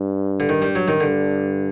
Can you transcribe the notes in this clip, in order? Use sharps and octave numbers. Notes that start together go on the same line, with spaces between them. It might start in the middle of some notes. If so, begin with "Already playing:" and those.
Already playing: G2
D3
D#3
G3
F#3
D#3
G2 D3